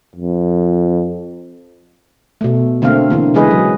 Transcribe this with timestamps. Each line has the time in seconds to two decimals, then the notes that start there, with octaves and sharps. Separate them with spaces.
0.16 F2
2.41 B2 A3
2.82 D3 A3 A#3 C4 F5
3.10 D3 E3 A#3
3.34 C#3 E3 G#3 G#4 B4 D#5
3.51 F#3